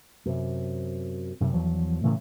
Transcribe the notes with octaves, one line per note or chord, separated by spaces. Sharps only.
F#2 C3
F#2 C3
E2 F3 F#3
A2 C#3 E3 A3